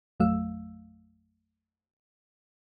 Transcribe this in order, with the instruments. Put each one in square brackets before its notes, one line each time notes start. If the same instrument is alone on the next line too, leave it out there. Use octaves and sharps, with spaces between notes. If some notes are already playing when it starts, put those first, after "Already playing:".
[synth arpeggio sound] A1 F2 F#3 A3 F5 E6